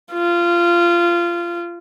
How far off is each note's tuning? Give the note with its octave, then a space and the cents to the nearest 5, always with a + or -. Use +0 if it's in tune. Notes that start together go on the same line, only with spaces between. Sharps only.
F4 -20